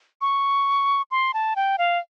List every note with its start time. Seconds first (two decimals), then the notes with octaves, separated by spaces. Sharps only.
0.21 C#6
1.11 C6
1.34 A5
1.56 G5
1.78 F5